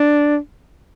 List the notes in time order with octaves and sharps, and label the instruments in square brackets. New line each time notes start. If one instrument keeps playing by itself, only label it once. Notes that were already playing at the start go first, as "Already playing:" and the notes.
Already playing: [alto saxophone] D4